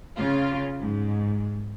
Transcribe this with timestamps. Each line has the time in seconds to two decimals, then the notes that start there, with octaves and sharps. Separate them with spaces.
0.17 C#3 F4
0.79 G#2